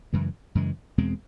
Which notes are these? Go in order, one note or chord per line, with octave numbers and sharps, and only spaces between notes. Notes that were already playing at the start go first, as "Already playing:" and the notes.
F#2 C#3 E3 G#3
F#2 C#3 E3 G#3
E2 B2 G#3 C4